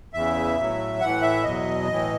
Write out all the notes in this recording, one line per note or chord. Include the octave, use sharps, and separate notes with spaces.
E2 C#3 E3 E5
A2 F#3
A2 E3 F#5
E5
E2 B2 F#3 D#5
A2 E3